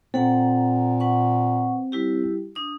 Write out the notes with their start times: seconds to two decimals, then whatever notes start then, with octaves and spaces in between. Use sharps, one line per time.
0.14 A#2 C4 A4 F#5 A#5
1.00 B4 F#5 C#6
1.92 G3 E4 G4
2.55 D4 D#6